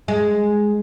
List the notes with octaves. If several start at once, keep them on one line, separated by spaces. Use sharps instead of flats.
G#3